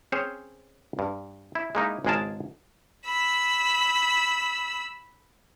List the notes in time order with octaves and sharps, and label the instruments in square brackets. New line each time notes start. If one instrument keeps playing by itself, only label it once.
[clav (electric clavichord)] C4 C#4 G#4 C5 C#5
G2
E4
G#3 A#3 D#4 E4
G#1 C#2 G#3 G#4 A#4 A5
[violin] B5 E6